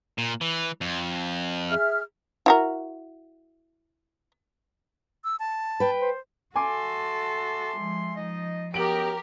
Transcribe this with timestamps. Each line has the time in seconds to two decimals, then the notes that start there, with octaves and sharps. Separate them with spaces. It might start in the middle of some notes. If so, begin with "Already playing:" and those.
0.18 A#2
0.41 E3
0.81 F2
1.70 G#4 E5 F6
2.46 E4 F#4 A#4
5.24 E6
5.40 A5
5.80 B4 G5
6.01 C5
6.56 F#4 A4 E5 G#5 A5 C6 D6
7.77 F3 G#3
8.16 F3 D#4 D#5
8.74 F#2 B3 G4 A#4 D7 F#7